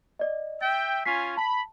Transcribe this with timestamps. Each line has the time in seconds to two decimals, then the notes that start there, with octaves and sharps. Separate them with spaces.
0.19 D5 D#5
0.61 E5 G5 A6
1.05 C#4 F4 G#5 B6 C7
1.37 A5 B5